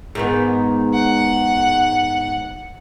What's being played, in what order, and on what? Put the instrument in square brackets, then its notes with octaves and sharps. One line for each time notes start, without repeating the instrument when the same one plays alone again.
[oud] G#2 D#3 B3
[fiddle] F#5